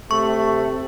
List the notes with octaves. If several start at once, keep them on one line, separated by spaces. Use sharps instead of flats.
C3 A3 C#6